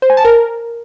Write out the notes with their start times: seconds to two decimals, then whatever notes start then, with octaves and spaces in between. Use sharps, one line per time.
0.02 C5
0.10 G#5
0.17 A5
0.25 A#4